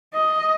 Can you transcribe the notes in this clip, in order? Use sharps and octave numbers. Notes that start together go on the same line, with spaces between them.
D#5